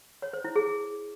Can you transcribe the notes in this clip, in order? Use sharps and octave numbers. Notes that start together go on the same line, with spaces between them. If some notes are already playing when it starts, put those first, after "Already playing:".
C#5
C5
E4
G#4